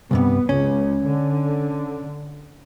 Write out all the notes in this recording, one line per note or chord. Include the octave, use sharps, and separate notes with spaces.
C2 G2 C3 B3
C#2 C#4
D3